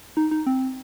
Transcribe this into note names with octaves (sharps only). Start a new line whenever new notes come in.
D#4
D#4
C4